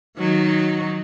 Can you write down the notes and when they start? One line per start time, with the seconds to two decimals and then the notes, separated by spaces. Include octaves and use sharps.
0.18 D#3 F#3 D#4